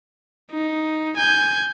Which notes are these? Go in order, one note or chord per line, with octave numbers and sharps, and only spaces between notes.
D#4
G#5 G6